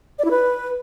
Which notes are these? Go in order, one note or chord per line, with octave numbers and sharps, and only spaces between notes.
D5
E4
B4